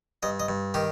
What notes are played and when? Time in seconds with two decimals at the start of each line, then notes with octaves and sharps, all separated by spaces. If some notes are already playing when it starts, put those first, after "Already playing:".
0.23 G2 D#5
0.40 D#5
0.48 G2
0.74 D#3 G4